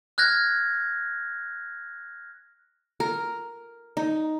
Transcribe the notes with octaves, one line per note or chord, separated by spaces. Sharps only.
F6 F#6 G#6 A#6
A#4
D#4